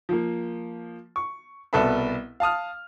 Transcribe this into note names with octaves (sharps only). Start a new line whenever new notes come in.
F3 A#3
C#6
C2 B2 A4 B4 E5 B5
F5 A5 D#6 F6